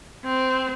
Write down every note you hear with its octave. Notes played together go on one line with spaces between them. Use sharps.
C4